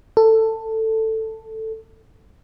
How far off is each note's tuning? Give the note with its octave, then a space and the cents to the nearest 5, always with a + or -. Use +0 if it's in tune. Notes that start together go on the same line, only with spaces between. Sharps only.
A4 +10